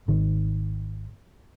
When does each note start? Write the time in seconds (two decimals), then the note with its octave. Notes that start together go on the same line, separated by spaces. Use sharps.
0.08 G#1 D#3